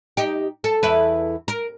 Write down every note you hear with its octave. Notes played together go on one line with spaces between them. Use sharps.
D#4 G4
A4
E2 E4 B4
A#4